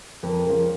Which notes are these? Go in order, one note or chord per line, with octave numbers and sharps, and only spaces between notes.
F2 A#4
C#3 F3